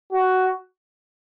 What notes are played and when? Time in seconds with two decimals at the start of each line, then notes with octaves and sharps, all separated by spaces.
0.12 F#4